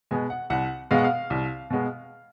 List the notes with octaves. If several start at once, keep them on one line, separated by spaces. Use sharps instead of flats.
B2 G#3 B3 G#5
F#5
C2 F#5
B2 G#3 B3 F5
F#5
F5
C2
B2 G#3 B3